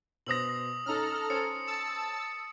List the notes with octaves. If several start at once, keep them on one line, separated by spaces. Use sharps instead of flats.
B2 C5 D#6 E6 A#6 F#7
C#4 D#4 A4 A#5 F6
C#4 C5 C#5 C#7
A5 E6